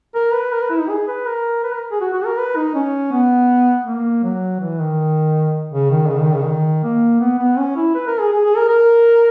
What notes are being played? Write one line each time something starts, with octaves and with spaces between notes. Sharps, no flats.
A#4
B4
A#4
B4
E4
D#4
G#4
B4
A#4
B4
A#4
G#4
F#4
F#4
A#4
B4
D#4
C#4
B3
A#3
F#3
E3
D#3
C#3
D#3
C#3
D#3
C#3
D#3
A#3
B3
B3
C#4
E4
B4
A#4
G#4
G#4
G#4
A#4
A#4